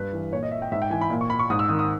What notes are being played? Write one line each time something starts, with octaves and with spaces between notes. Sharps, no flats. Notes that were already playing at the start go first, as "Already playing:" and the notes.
Already playing: G2 B4
E3
A#2 C#5
D#5
E5
G5
G#2 E5
G5
E3 G#5
B5
A#2
C#6
B5
C#6
G#2 D#6
E6
D#3 D#6
D#6